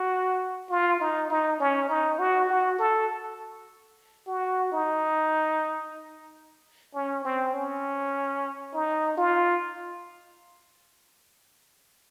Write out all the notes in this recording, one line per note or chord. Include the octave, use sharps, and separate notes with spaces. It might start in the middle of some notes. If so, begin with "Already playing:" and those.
Already playing: F#4
F4
D#4
D#4
C#4
D#4
F#4
F#4
A4
F#4
D#4
C#4
C4
C#4
D#4
F4